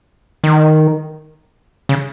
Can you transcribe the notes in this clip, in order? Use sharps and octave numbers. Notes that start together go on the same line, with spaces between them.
D#3
C#3